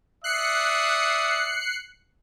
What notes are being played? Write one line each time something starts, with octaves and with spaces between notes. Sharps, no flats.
D5 E5 D#6 F#6 C7 C#7